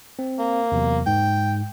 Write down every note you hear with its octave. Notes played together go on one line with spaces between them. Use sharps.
C4
A#3
E2 C3 F#3
G#2 G5